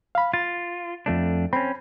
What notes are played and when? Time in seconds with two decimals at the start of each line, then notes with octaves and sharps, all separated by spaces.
0.15 F5 B5
0.33 F4 A6
1.06 F2 A3 D4
1.53 C4 C#4 B5